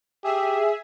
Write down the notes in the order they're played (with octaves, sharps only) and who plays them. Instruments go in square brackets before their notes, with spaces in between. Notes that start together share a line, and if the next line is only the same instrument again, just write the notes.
[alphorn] G4 [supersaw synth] G#4 E5